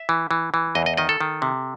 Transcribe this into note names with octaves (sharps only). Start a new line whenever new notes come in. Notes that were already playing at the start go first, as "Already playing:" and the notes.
Already playing: E5
E3
E3
E3
E2 D#5
D#5
D#3 D#5
A4
D#3
C3